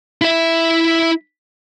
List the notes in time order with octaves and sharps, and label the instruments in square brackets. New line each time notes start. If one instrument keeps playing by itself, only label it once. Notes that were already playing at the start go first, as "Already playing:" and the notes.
[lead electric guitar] E4 E5